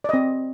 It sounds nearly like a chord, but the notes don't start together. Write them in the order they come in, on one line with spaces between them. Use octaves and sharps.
D5 D#5 C4